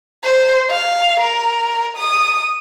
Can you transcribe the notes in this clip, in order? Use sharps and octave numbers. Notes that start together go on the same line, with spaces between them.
C5
F5
A#4
D#6